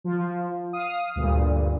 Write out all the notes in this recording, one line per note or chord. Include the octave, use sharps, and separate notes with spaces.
F3
F5 D#6 D#7
D2 G2 A#2